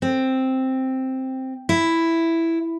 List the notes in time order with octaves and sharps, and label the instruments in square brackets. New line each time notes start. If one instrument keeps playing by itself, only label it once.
[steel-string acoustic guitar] C4
E4